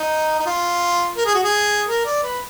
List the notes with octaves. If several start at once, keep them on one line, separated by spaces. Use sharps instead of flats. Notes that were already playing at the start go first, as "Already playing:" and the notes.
Already playing: D#4
D#4
F4
A#4
G#4
F#4
G#4
A#4
D5
B4